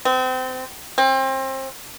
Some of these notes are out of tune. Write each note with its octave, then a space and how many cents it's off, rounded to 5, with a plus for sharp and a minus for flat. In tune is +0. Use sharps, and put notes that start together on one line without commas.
C4 -30
C4 +30